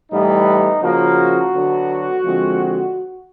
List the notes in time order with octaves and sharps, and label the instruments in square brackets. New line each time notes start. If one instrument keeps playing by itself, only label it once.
[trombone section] A2 E3 G3 B3 D#4
C#3 F3 A#3 F#4
D3 F#3 B3
D3 F3 G#3 C4